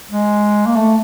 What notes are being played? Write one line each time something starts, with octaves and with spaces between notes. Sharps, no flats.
G#3
A#3
A3